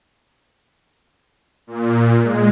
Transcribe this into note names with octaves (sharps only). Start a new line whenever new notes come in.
A#2
G#3